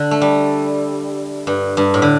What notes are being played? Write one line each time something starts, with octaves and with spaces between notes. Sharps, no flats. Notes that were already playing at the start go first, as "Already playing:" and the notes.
Already playing: D3
A3
G3
G2
G2
A2
D3